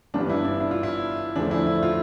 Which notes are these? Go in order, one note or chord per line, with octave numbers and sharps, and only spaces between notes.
G1 G2 E3 B3 D4
E4
D4
E4
F4
E4
E2 D3 F3 A3 D4
E4
E4
F4